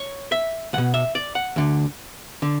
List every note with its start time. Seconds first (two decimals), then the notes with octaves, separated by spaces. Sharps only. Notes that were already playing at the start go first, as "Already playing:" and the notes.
Already playing: C#5
0.32 E5
0.73 C#2 B2 F#5
0.94 E5
1.15 D5
1.35 F#5
1.56 D2 D3
2.42 D3